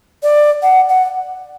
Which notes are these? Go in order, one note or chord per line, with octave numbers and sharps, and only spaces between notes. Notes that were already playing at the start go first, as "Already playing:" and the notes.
D5
F#5
F#5